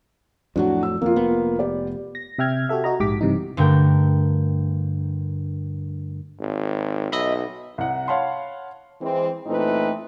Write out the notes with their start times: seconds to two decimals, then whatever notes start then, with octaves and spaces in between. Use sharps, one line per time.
0.56 F2 A2 F#3 D4 F#4
0.83 E6
1.02 F2 A#3 F4
1.16 F1 B3
1.59 G4 D5
2.15 A#6
2.38 C3 E5 G5 F6 G#6
2.69 F#4 G4 A4 E5
2.84 F#4 D#5 A#5
3.00 A#1 G#2 G4 D6 B6
3.21 G2 C3 E3 D#4
3.57 G2 D3 A3 A#4 G5
6.40 G#1
7.12 B1 D#5 E5 B5
7.78 C2 F#5
8.08 C#5 F5 F#5 A5 B5 C6
9.01 E3 G#3 C4
9.46 A#2 E3 A3 C4 D#4 B4